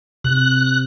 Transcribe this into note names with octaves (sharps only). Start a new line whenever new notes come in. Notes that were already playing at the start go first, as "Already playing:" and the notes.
C3 F#6